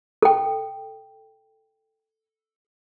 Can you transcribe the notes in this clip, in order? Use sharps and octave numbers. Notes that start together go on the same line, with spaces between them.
A4 G5